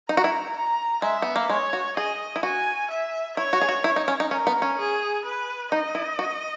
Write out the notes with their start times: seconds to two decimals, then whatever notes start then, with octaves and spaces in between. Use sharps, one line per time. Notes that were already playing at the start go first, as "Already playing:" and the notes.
0.09 D#4 A#5
0.17 F#4
0.24 E4
0.56 A#5
1.02 G#3 E5
1.22 B3
1.36 A#3
1.50 G#3 C#5
1.73 F#4
1.96 G#4 D#5
2.36 E4
2.43 F#4 G#5
2.90 E5
3.37 E4 C#5
3.53 F#4
3.61 G#4
3.69 F#4
3.84 E4 C#5
3.96 D#4
4.08 C#4
4.20 D#4
4.31 C#4 A#4
4.47 B3
4.62 C#4
4.78 G#4
5.25 B4
5.72 D#4 D#5
5.95 E4
6.19 F#4